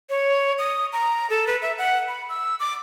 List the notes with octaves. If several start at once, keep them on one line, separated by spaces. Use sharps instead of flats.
C#5
D#6
A#5
A4
B4
E5
F#5
B5
E6
D6